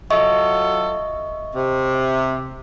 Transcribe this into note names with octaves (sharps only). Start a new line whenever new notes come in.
F#3 F4 A4 D#5 E5 C#6
C3